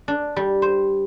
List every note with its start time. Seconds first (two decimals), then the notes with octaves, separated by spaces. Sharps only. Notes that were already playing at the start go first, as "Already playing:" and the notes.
0.08 D4
0.36 G3
0.62 C5